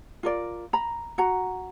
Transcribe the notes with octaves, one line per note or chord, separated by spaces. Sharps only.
F4 A#4 D5
A#5 B5
F#4 F#5 A#5